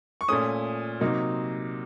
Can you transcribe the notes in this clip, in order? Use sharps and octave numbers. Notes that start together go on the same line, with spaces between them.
C#6
A#2 A3 C#4 D#6
C3 F#3 A#3 D#4